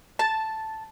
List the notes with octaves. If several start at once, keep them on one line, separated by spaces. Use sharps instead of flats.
A5